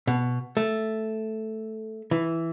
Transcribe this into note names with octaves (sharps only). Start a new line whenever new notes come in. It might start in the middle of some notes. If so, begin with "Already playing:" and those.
B2
A3
E3